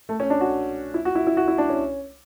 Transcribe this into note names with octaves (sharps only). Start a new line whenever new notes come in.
A3
C#4
D4
F#4
E4
F#4
E4
E4
F#4
E4
D4
C#4